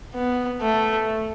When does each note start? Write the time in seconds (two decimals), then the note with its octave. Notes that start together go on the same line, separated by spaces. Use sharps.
0.14 B3
0.61 A3